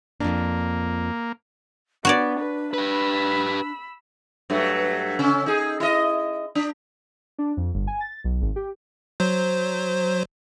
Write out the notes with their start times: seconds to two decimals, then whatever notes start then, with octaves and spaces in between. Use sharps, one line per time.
0.21 F2 G#2 A#3 D4
2.05 B3 D4 F#4 C#5 D5
2.40 B4
2.74 G4 B4 B5 E6
4.50 G2 F#3 A3
5.19 C#3 C#4
5.46 D#4 G#4
5.80 E4 D#5
6.55 D4
7.38 D4
7.57 F2
7.74 G1
7.87 G#5
8.01 A6
8.24 B1
8.41 G#1
8.56 G4
9.20 F#3 C5